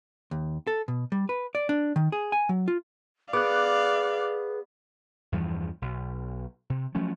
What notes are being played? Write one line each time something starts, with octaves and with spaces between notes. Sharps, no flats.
D#2
A4
B2
G3
B4
D5
D4
D#3
G#4
G#5
F#3
F4
B3 G#4 D5 F5 D6 F#6
E2 G2 E3 F3
B1
C3
F3 F#3 A3 C#4